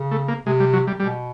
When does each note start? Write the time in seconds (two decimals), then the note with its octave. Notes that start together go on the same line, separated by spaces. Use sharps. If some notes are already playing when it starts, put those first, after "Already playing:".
Already playing: C#3
0.11 A3
0.28 A#3
0.46 C3 G#3
0.60 G3
0.73 F#3
0.87 G3
1.00 B2 G3